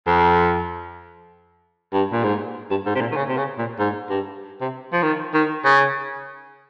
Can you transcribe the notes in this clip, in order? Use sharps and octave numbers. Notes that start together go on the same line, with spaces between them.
F2
G2
A#2
G#2
G2
G#2
C3
A#2
D#3
C#3
C3
C#3
A#2
G#2
G2
C3
F3
D#3
D#3
C#3